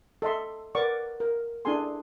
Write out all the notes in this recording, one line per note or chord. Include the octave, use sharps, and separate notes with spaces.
A4 D#5 E5 C6
A#4 B4 D5 F#5 C#6 D6
A#4
D4 E4 G#4 A4 G#5 C6